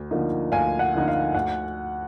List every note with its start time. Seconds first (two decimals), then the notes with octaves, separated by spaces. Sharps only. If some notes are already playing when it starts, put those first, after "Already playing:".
Already playing: D2
0.11 D3 F3 A#3 D#4
0.52 D2 F5 G#5
0.79 F#5
0.94 D3 F3 A#3 D#4
1.08 F5
1.35 D2 F#5